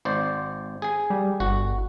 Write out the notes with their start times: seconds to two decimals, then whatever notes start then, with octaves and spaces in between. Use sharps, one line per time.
0.05 G#1 C5 D5
0.82 G#4 G#5
1.10 G3
1.40 G1 F#4